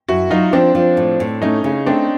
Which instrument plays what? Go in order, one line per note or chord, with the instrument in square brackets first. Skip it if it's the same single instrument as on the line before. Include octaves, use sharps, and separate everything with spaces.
[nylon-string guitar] F#2 [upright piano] E4 F#4
[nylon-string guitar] F#3 [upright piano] D#4 F4
[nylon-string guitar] F3 [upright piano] C4 D4
[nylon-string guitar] F3
A2
A2
[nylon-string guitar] A3 [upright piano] C#4 D#4
[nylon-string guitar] C#3
[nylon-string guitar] A3 [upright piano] C4 D4